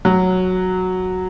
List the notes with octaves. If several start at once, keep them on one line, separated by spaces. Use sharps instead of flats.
F#3